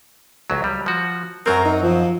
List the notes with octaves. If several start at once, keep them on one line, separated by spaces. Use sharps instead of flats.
C#2 F#3
G3
F3 F#4
F#2 F#3 C4 A#4
D#4
F3